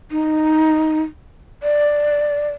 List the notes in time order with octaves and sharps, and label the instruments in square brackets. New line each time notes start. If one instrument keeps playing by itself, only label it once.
[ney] D#4
D5